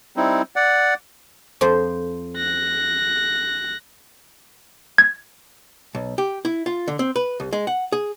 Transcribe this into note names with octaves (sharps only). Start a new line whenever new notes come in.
G3 C4 D#4 E4
D5 F#5
F2 F3 C5
F#6 A#6
G#6
B1
G4
E4
F4
D3
C4
B4
C2
G#3
F#5
G#4